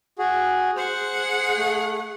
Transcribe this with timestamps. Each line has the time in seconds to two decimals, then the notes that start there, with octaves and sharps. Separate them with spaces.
0.18 F#4 G#4
0.76 G#4 C5 F#5
1.58 A3